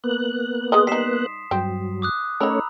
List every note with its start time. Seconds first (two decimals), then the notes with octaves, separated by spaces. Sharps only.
0.04 A#3 B3 F#6
0.72 G#4 B4 D#5 C6 D#6
0.87 G3 D#4 B6 C7 E7
1.51 G2 F#3 C4
2.02 D6 D#6 F#6
2.40 A3 C#4 D#4 A#4 C#5 A#5 B5 E6